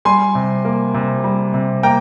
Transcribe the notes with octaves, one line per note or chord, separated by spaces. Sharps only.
G3 G#5 C6
C3
A#3
C3
G3
C3
A#3 G5 A#5